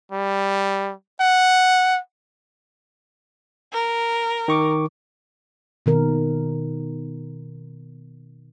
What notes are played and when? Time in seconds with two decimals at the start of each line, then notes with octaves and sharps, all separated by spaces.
0.11 G3
1.20 F#5
3.73 A#4
4.48 D#3 C#6 D6
5.86 B2 D#3 A#4